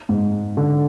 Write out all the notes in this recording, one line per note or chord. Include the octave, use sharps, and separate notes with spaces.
G#2
D3